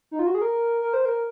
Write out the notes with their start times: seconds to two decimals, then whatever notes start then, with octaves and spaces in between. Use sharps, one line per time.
0.11 D#4
0.19 F4
0.27 F#4
0.35 G#4
0.42 A#4
0.81 A#4
0.93 C5
1.05 A#4